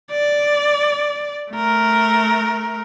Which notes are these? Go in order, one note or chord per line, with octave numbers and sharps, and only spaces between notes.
D5
A3 A#4